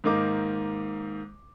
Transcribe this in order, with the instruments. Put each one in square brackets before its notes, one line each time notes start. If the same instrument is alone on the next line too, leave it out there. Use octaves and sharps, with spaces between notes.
[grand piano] G#2 D#3 A#3 D#5 D6